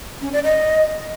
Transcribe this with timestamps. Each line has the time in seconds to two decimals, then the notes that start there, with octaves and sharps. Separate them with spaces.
0.21 C#4
0.33 D5
0.44 D#5